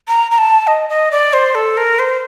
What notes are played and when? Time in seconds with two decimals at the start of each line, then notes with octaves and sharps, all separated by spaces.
0.08 A#5
0.31 A#5
0.38 A5
0.67 D#5
0.89 D#5
1.11 D5
1.33 C5
1.55 A4
1.77 A#4
1.99 C5